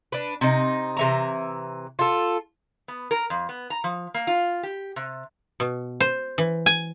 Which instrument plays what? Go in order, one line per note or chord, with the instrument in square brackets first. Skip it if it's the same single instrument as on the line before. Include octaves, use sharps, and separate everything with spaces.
[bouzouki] D4 B4
C3 D#4
C3 E3 A#5
F4 A4
[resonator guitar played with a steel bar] B3
A#4
F2
B3
A#5
F3
A#3
F4
G4
C3
[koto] B2
C5
E3
G#5